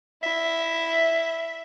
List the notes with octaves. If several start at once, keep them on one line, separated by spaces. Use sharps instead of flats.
E4 E5